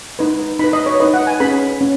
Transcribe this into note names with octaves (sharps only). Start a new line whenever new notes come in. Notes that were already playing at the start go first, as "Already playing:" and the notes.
D#4 B4
D#4 B4 B5
D#5
C#5
D#4 B4 D#5
F#5
G#5
C#4 G#4 B4 B5
C#4